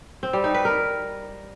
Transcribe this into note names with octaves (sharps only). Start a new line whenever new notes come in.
C4
G3
D#4
B4
A#4